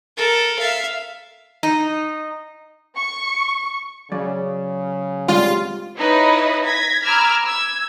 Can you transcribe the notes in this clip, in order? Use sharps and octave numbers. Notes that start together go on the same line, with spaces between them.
A4 A#4
E5 F5
D#4
C#6
C#3 F#3 D5
G#2 C3 G3 F4
D#4 E4 B4 C#5 D#5
G#6 A#6 B6
A#5 B5 D6 E6 F6 G#6
E6 G#6